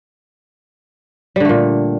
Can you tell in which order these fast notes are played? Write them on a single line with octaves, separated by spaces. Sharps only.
G3 D3 A3 A#2